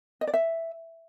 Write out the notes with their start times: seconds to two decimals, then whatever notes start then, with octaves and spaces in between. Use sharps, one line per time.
0.21 D#5
0.27 D5
0.34 E5